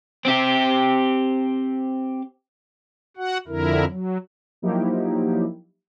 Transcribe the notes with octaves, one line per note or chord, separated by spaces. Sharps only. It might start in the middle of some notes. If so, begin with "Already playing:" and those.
C4 G4
F#4 F#5
F2 D3 E4 A#4
F#3
F3 F#3 A#3 D#4 E4 G4